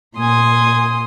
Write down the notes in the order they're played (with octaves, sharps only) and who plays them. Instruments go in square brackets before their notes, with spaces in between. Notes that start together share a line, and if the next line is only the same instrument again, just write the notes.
[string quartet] A#2 C6 D#6 [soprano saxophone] G#5